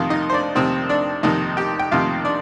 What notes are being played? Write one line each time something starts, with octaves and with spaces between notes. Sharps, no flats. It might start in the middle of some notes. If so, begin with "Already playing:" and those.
Already playing: F2 C3 D#3 F4 F5
D#4 D#5
C5
D4 D5
F2 C3 D#3 C4 C5
D4 D5
F2 C3 D#3 D#4 D#5
G4 G5
G5
F2 C3 D#3 F4 F5
D4 D5